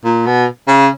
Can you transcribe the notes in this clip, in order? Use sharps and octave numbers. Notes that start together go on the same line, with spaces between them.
A#2
B2
C#3